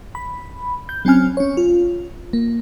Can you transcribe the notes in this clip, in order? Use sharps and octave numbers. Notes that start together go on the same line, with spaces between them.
B5
G6
F#3 C4 C#4 G#5 F6
C#4 C#5
F4
A#3